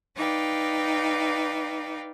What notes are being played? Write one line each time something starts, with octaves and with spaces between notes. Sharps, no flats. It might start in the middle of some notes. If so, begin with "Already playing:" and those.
D#4 B4 D5 F5 G5